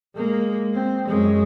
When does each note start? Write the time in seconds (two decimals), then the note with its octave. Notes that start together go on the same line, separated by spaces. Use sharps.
0.15 G#3 A#3
0.75 C4
1.08 F#2 G#3